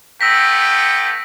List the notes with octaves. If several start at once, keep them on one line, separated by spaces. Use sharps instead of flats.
A3 B3 G5 E6 A#6 B6